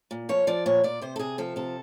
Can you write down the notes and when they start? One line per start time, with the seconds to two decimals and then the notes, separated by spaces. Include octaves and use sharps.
0.11 A#2
0.29 F3 C#5
0.47 F3 D5
0.66 A#2 C#5
0.84 A#2 D5
1.01 C3 C5
1.16 A4
1.19 C3 G#4
1.38 F3 A4
1.56 C3 A4